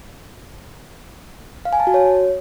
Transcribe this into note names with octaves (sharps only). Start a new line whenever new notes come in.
F5
G#5
A5
F#4
C#5